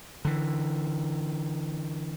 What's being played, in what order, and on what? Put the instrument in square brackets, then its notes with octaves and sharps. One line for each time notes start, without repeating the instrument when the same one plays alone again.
[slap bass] D3 E3